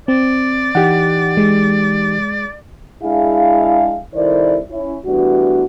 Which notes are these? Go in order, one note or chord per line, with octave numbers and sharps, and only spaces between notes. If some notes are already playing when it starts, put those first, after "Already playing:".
C4 D5
E3 D#4 G4 F#5
G#3
G#3 D4 E4 G#4 F5
C2 D#3 E4 A4 C5 D5
C#4 E4
E3 G3 A3 B3 D4 F#4